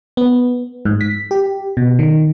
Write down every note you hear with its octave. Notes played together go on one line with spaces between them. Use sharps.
B3
G#2
B6
G4
B2
D#3